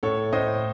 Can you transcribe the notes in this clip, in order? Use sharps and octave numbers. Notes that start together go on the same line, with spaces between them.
A2 A4 C#5
A2 C5 D#5